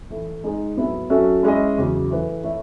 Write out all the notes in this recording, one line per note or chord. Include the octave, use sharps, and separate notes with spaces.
A2 E3 A3 E4
G#3 D#4 G#4
A2 F#3 B3 E4
F#3 C#4 F#4 A4 E5
G#3 C#4 E4 G#4 D#5
E2 C#3 F#3
E3 A3 E4 B4
A3 E4 A4 C#5 E5